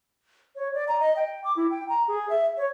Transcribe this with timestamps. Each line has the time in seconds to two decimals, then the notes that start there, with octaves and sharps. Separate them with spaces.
0.56 C#5
0.74 D5
0.88 A#5
1.00 D#5
1.16 G5
1.44 D6
1.56 E4
1.70 G5
1.89 A#5
2.08 G#4
2.29 E5
2.57 C#5